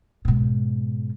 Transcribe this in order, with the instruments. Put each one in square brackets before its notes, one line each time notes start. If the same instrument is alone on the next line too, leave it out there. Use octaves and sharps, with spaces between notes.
[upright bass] G#2 B2